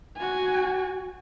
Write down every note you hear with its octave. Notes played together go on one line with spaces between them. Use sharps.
F#4 G#5